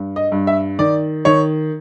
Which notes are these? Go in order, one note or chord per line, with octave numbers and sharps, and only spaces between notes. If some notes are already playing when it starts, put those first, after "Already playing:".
Already playing: G2
D#5
G2
E5
D#3 D5
D#3 C#5